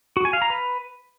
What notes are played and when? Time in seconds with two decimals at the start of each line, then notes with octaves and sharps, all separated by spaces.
0.17 F#4
0.25 G#5
0.33 F5
0.42 A#5
0.50 B4